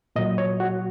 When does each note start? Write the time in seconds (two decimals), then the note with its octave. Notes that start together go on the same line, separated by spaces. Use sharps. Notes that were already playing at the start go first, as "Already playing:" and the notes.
0.16 A#2 F#3 D#5
0.38 C#5
0.60 F#4